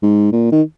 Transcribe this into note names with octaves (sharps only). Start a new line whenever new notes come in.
G#2
A#2
D#3